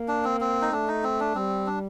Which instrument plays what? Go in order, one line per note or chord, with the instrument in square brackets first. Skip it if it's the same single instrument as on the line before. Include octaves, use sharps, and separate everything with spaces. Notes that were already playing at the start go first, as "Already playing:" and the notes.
Already playing: [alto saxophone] A#3
[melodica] D4
C4
C4
D#4
[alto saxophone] A3 [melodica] D4
[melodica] D#4
C4
D4
[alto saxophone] G3 [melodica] C4
[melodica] D4